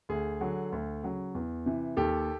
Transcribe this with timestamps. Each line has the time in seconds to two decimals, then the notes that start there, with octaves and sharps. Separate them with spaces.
0.09 D2 G#4
0.41 D3 F#3
0.72 D2
1.03 C#3 F#3
1.35 E2
1.66 C3 E3
1.97 D#2 G4 A4